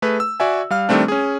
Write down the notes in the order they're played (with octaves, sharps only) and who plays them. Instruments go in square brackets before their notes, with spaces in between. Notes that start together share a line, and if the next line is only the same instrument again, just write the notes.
[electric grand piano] A3 G#4 B4
E6
F#4 D5 E5 G#5
G3 F5 F6
D#3 G3 A3 C4 D4
C#4 G#4